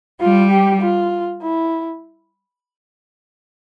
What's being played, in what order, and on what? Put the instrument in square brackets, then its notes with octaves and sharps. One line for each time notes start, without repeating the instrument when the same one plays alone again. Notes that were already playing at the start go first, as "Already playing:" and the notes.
[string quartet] G3 [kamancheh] F4
[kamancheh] G4
F4
E4